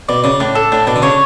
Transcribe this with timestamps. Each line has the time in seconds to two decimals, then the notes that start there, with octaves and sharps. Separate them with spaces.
0.09 B2 D5
0.24 C#3 D5
0.40 A2 D4
0.55 A4
0.72 A2 D4
0.87 B2 D4
0.96 D3
1.02 C#3 C#5